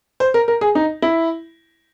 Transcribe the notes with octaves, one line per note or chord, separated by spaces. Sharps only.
C5
A#4
A#4
G#4
D#4
E4